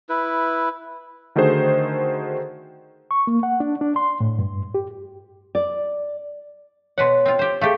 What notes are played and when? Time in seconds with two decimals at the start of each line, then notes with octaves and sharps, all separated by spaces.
0.09 E4 B4
1.36 D3 D#3 A3 F#4 G#4 C5
3.11 C#6
3.27 A#3
3.43 F#5
3.60 D4
3.81 D4
3.96 C6
4.20 A2
4.39 G2
4.74 G4
5.55 D5
6.98 B2 B4 C#5 F#5 C6
7.26 C4 F4
7.39 G4 C5
7.61 A3 G4 G#4 F5